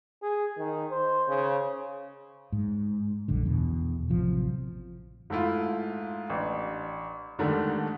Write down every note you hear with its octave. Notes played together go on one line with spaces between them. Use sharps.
G#4
D#3
C5
C#3
G#2
A#1 F#2 D3
E2 B2
A1 C3 F3 F#3
G#2 A3 E4 F4
A1 D4
G#2 D3 D#3 G3 A3